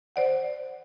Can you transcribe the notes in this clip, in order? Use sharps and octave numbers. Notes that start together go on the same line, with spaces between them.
C5 D5 F#5